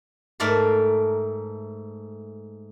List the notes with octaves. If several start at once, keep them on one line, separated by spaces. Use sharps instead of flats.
G#2 A3 A#4 D5 C6